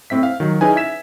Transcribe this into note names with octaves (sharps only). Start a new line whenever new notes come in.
A2 C4 E5 B6
F5
D#3 F#3
C#4 D#4 E4 G#4 B4 G#5
E5 G#6 B6 E7